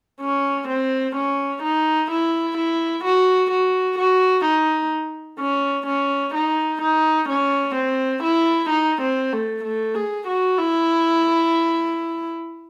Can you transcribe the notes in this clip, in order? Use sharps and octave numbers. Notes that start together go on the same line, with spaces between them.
C#4
C4
C#4
D#4
E4
E4
F#4
F#4
F#4
D#4
C#4
C#4
D#4
D#4
C#4
C4
E4
D#4
C4
A3
A3
G#4
F#4
E4